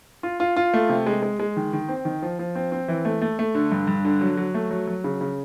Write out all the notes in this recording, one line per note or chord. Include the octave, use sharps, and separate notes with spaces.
F4
F4
F4
A3
C3
G#3
G#3
G#3
D#3
D#3
C4
D#3
F3
F3
C4
C4
E3
A3
A3
A3
D3
G2
G2
D3
F#3
F#3
A3
F#3
F#3
C#3
C#3